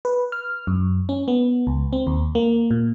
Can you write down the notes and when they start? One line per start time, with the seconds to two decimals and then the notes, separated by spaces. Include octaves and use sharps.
0.05 B4
0.32 F6
0.67 F#2
1.09 C#4
1.28 B3
1.67 C#2
1.93 C4
2.07 D#2
2.35 A#3
2.71 A#2